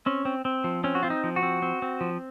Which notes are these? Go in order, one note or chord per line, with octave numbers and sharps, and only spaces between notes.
C4 C#4
C4
C4
F3
C4 C#4
F#4
C4 F4
D#4
F3
F#4
C4
C4
C4
F3